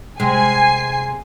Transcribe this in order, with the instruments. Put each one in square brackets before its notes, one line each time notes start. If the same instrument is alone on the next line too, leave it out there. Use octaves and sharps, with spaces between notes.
[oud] C3 G#3 [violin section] G#5 C7